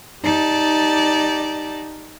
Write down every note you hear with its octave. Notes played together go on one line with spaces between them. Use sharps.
D#4 G4 D5 A5